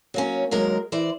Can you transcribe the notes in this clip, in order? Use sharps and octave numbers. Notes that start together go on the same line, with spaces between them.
F#3 A#3 C#4
D#2 F#3 G#3 A#4
E3 C5 D5